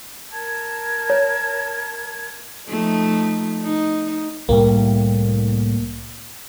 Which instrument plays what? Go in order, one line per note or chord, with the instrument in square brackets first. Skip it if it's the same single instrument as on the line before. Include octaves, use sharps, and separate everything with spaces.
[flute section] A#4 A5 G#6
[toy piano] C#5
[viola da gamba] F3 A3 D#4
D#4
[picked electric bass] C2 A2 G3 [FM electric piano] A#3